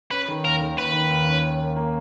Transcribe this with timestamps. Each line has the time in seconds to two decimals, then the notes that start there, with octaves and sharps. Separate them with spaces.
0.11 C#4 B4
0.28 D#3
0.44 D#2 A#4
0.61 D#3
0.77 D#2 B4
0.93 D#3
1.10 D#2
1.27 C#4
1.44 D#2
1.60 A#3
1.76 A#3